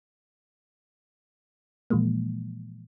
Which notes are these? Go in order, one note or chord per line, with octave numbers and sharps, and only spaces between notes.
A#2 E3 F3 G#3 A#3